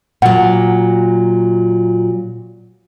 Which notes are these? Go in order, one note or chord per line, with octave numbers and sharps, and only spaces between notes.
A#2 F#3 F#5